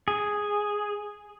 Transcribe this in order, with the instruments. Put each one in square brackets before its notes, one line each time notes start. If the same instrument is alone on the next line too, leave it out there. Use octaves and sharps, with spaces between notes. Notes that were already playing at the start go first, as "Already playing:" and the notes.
[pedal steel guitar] G#4